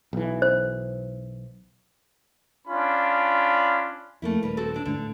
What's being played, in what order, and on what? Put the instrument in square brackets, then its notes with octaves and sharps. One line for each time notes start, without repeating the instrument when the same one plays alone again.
[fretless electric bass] B1 E3
[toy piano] C5
[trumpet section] C#4 D4 F4 B5
[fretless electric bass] F2 [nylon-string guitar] A3 A#3 E4
[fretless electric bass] D#1 [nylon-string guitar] G3 A#4 B4
[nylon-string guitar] C4 F#4 A4
F#3 D4
[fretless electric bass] D2 G#2 D4 [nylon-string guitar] D3
[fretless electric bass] A2